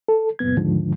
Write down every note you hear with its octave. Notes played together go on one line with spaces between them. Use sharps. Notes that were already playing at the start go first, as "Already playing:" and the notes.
A4
C#2 F#2 A#2 B3 G#6
D#2 G#2 D3 F3